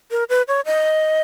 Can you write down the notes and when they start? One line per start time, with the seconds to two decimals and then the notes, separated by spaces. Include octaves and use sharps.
0.11 A#4
0.29 B4
0.48 C#5
0.66 D#5